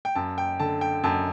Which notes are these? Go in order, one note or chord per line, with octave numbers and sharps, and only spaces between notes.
G5
F#2 A5
G5
D3 A5
G5
F#2 A5